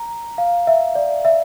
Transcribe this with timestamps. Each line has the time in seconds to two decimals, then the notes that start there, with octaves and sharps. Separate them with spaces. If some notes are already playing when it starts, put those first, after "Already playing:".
Already playing: A#5
0.38 F5
0.67 E5
0.95 D5
1.25 E5